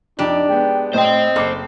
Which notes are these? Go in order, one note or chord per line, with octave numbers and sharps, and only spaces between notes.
F2 D4 D#4 G4
G#3 B3 G5
A2 C5 D#5 G5
F#1 A4 D6 C7